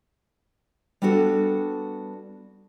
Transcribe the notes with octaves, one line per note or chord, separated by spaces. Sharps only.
G3 B3 D4 F#4 A4